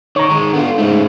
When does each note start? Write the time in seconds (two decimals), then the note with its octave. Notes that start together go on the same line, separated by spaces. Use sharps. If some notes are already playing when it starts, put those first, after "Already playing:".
0.16 D#3 C#5 A#5
0.30 D#3 G#3
0.53 D3 B3 F4
0.78 G#2 C#3 A3